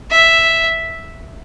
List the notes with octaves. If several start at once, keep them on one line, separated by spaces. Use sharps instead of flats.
E5